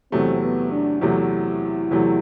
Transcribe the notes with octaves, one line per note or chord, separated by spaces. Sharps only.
E2 C3 F#3 A3 C4
B3
D4
E2 C3 F#3 A3 E4
E2 C3 F#3 A3